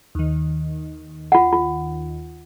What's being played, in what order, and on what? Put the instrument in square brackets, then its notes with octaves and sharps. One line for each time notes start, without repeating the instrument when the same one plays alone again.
[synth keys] D#2 D#3
[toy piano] F4 F#5
F4